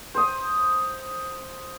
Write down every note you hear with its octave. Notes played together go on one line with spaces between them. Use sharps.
C5 D#6